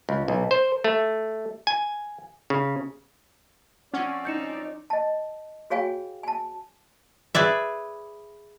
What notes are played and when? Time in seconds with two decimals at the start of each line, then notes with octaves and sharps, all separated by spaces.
0.09 C#2
0.28 B1
0.51 C5
0.84 A3
1.67 G#5
2.50 C#3
3.94 F3 C4 C#4 D5 F#5
4.25 D#4 G6 C#7 E7
4.90 D#5 A5
5.70 F#4 G#4 C#5 F5 G5 G#5
6.23 G#5 A5
7.35 G#4 B4 D5 E5